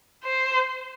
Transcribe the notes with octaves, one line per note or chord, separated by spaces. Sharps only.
C5